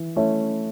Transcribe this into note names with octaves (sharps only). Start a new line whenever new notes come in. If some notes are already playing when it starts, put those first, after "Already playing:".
Already playing: E3
A3 C#4 E4